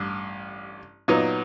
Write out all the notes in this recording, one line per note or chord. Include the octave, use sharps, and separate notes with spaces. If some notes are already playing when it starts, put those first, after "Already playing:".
Already playing: A1 G2
A#2 F#3 B3 D#4